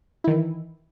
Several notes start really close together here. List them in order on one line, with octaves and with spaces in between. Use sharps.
E4 D#3 E3